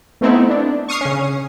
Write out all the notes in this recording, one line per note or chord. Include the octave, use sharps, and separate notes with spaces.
A3 B3 C4 D#4 E4
D4
C#6 D#6 F6 C7
C#3 C#4